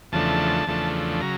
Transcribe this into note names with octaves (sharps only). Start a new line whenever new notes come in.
E2 C#3 F3 A3 D4 A5
E2 C#3 F3 A3 D4
C#3 F#3 A#5